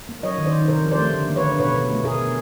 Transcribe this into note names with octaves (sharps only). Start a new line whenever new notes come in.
A#3
F#3 C#5 D#5
D#3
C5 D5
D#3
C3 A#4 C5
F3
C5 D5
A3
D3
A#3
B4 C#5
D3
B2 B4 C#5
B2
A3
B2 G#4 A#4
B2